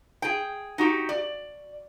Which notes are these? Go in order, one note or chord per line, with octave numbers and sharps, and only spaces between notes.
G#4 G5
D#4 F#4 G4
D5